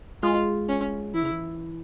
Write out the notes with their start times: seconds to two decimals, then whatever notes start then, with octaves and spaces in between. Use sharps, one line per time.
0.22 G#3 F4
0.68 C#4
1.14 E3 E4
1.23 C#3
1.31 E3